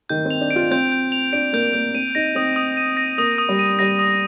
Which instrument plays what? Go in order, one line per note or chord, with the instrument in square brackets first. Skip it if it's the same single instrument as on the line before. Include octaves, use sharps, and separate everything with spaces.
[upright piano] D#3 [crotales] G6
[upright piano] C4
[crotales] F7
[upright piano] D4
[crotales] D7
[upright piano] F4
[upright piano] C4 [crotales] G6
[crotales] G6
F7
[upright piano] D4 [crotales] D7
[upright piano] A#3 [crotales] G6
[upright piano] A#3 [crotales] G6
[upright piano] C4 [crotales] D#7
[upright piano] D#4 [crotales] A#6
[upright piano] C4 [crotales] D#6
[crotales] D#6
D#7
A#6
[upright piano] A#3 [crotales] D#6
[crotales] D#6
[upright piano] G3
[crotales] D#7
[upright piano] G3 [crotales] A#6
[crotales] D#6